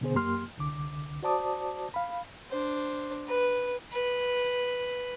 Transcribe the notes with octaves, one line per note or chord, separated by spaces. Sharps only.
B2 D3 B3 G#4 C5
F#2 A#3 G4 C6 F6
C2 D3 D6
F#4 C5 D5 A5 D6 D#6
F5 B5
D4 C5
B4
B4